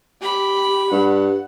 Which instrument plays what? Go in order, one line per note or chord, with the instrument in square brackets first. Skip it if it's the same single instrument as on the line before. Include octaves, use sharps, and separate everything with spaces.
[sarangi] G4 [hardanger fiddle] B5
[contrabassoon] G2 [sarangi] F#5